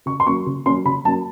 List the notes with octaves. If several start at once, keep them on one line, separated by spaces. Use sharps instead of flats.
C#3 C#6
C6
F#3 A#3 C#4 C#6
C#3
F#3 A#3 C#4 C6
C#3 B5
F#3 A#3 C#4 A5